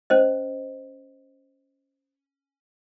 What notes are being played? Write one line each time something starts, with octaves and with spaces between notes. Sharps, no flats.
C#4 C5 D#5